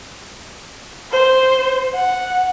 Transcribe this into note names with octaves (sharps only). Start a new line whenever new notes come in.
C5
F#5